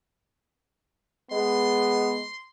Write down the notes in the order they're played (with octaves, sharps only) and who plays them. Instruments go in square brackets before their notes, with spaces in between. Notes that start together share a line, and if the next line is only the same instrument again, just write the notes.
[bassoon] G#3 [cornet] B3 [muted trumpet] C6